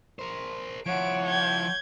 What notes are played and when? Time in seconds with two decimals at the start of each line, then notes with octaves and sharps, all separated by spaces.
0.19 A#4 C5
0.86 F3 E4 C#5 F#5 D7
1.24 G6 G#6